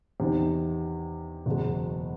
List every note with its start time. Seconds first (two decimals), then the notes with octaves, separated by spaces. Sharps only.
0.20 E2 C3 D#3
1.46 F#1 E2 B2 G#3